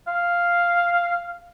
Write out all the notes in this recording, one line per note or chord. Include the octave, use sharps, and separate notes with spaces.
F5